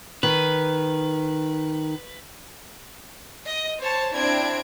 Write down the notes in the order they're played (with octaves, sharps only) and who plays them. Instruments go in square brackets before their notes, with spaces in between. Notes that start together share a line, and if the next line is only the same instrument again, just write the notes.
[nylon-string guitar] D#3 [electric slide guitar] B4
[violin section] D#5
C5 C#5 A5
C4 D4 E4 G#6 D7